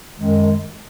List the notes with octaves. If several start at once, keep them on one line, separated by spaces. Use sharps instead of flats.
F#2 D#3 G#3